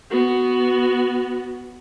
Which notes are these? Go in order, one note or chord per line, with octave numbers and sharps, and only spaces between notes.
B3 F#4